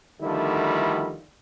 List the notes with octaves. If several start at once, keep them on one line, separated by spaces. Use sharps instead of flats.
D2 D3 D#3 F3 G3 E4